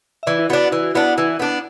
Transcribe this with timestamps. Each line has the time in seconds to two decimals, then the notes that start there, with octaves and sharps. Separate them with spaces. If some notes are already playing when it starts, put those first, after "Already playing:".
0.23 E5
0.27 E3 B4 D5
0.39 E4
0.49 B3 D4 F#4
0.72 E3 E4
0.83 F#4
0.95 B3 D4 E4
1.18 E3
1.40 B3 D4